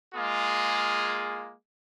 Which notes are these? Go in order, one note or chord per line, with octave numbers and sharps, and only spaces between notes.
G#3 A#3 F4 G#4